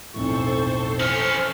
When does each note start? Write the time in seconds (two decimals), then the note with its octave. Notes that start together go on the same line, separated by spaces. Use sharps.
0.14 B1 F2 A2 A4 C5 C#6
1.00 E3 C#4 F6